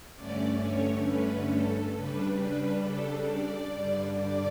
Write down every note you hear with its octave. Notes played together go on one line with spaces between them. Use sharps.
G2 D3 A3 C#4 D5
C#5
B4
A4
C#3 G3 D4 B4
B4
A4
D5
G2 D3 G3 D4
D5